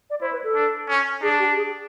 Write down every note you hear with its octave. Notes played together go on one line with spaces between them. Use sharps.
D5
E4 C5
B4
A4
D4
C#4
D4 G#4
G4
G#4